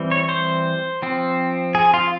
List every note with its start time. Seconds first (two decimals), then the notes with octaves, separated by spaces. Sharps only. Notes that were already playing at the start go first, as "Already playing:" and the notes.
Already playing: E3 G3 C4
0.11 C#5
0.29 C5
1.02 F3 C4
1.75 G#4
1.94 F4